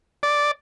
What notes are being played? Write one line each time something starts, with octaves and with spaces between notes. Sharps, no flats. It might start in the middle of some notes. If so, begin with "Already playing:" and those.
D5